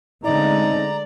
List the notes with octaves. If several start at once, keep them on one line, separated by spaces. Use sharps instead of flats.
D3 G#3 A3 C4 C#4 D#4 D5 A#5